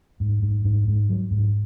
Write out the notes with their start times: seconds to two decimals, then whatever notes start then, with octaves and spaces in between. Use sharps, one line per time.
0.20 G#2
0.42 G#2
0.64 G#2
0.87 G#2
1.09 F#3
1.31 G#2